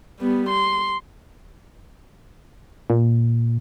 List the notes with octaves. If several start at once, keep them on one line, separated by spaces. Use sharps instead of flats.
G3 B3
C6
A#2